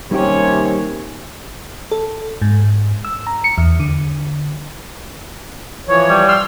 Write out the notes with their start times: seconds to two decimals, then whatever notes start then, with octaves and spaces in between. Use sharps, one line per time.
0.11 D#2 C3 G3 C#4 G4 C#5
1.92 A4
2.42 G#2
3.05 E6
3.27 A#5
3.44 C#7
3.58 E2
3.80 D3
5.88 E3 F3 C#5
6.10 G3
6.28 C6 E6 F6